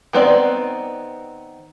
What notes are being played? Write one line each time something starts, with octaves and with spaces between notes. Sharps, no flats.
D#3 B3 C4 D5